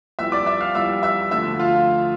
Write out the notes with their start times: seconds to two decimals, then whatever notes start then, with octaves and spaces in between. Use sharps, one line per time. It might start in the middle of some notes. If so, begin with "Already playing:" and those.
0.19 F2 E3 G3 E5 E6
0.32 D5 D6
0.46 E5 E6
0.61 F5 F6
0.75 F2 E3 G3 E5 E6
1.03 E5 E6
1.31 D2 D3 F3 E5 E6
1.60 F4 F5